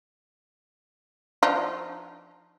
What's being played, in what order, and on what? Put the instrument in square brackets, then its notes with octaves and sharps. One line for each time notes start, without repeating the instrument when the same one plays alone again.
[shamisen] F3 D4 D#4